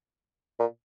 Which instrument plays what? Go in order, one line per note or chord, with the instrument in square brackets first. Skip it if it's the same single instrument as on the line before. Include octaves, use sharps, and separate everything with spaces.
[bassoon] A#2